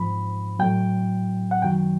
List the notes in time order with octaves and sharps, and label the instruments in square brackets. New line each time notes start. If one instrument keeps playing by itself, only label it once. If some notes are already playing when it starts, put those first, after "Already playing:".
Already playing: [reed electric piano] G#2 F3 B5
A2 F#3 G5
F#5
F#2 D#3 F#3 G5